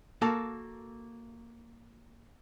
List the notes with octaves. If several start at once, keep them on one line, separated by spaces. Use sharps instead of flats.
A#3 F#4 A4 F5 A5